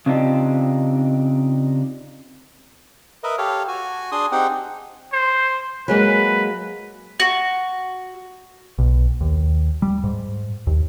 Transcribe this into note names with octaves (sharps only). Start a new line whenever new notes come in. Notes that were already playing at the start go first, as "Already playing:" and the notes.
C#3 C4 D4 D#4 F4 G4
A#4 B4 D#5 E5
G4 A4 C#5 F5
F#4 G#5
D4 G#4 G#5 C6 D#6
C4 D#4 G4 G#4 F#5 G5
C5
F#3 G#3 A#3 B4
F#4
B1
D#2
G3
G#2
D#2